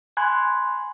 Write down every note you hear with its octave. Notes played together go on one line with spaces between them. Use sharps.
G#5 B5 C6 F#6 G#6